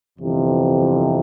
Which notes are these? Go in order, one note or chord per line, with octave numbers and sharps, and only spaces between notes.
G1 F2 C3 E3